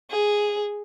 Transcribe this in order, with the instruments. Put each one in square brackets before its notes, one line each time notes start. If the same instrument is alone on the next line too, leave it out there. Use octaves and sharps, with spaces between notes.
[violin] G#4